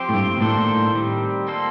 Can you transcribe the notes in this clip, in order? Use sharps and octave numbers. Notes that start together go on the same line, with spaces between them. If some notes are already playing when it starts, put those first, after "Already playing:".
Already playing: F3 C4 G4 C5
A2
G2
A#2
A2 D#3 A#3 D4 A4 C5
D#3 G3 C4
A#3 F4 A4 C5